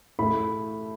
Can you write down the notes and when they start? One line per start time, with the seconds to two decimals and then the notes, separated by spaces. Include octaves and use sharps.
0.19 A2 A3 B5